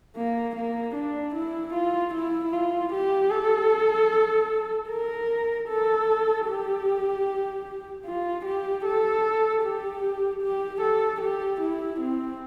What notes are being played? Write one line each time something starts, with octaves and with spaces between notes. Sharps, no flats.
A#3
A#3
D4
E4
F4
E4
F4
G4
A4
A#4
A4
G4
F4
G4
A4
G4
G4
A4
G4
E4
C4